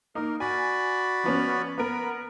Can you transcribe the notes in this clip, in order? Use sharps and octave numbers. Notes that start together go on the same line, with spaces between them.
A#3 D#4 A#4
F#4 D5 G#5 B5
F3 B3 C#4
B3 A#4 B5